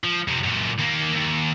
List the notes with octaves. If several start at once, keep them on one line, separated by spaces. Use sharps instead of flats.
F3
F2 C3
F#2 A#2
D#2 A#3
D#2